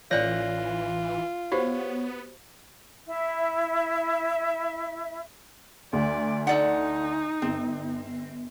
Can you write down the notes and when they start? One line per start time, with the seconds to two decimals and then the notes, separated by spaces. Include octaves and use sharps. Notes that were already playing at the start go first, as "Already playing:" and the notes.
0.11 A1 E3 F4 C#5 D5 G5 F#6 A#6
1.52 B3 F#4 G4 C5 C#5
3.07 E4 E5
5.93 D2 D5
6.47 D#4 A4 D5 F#5
7.42 G1 C4